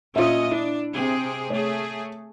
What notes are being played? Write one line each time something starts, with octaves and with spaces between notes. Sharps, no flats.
A#2 C#4 F4 D#5 E5
D4 E4
C3 C4 G#4
A3 G#4 C#5